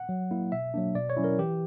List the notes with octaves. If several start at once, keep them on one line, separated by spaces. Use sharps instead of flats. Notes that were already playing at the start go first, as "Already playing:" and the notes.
Already playing: F#5
F#3
A#3 E4
B2 E5
F#3 A#3 D4
B2 D5
C#5
F#3 C#4 E4
A#4
E3 G4